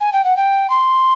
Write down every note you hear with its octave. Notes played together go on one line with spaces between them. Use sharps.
G#5
G5
F#5
G5
C6